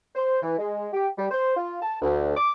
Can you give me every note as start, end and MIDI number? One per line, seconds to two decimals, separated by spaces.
0.15 0.38 72
0.42 0.57 52
0.59 0.88 56
0.93 1.08 67
1.17 1.26 55
1.31 1.56 72
1.57 1.80 65
1.82 1.96 81
2.01 2.33 38
2.37 2.51 86